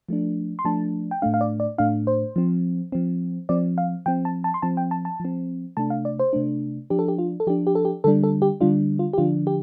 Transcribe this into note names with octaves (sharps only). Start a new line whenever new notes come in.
F3 A3 D4
C6
F3 A3 D4 A5
G5
A2 A3 D4 F5
F5
D5
D5
A2 A3 D4 F5
C5
F3 C4
F3 C4
F3 C4 D5
F5
F3 C4 G5
A5
A5
C6
F3 C4 A5
G5
A5
A5
F3 C4
C3 A3 D4 A5
F5
D5
C5
C3 A3 D4
F3 D4 G4
A4
G4
F4
A4
F3 D4 G4
G4
A4
G4
D3 G3 D4 A4
A4
G4
D3 G3 D4 F4
F4
G4
D3 F3 D4 F4
G4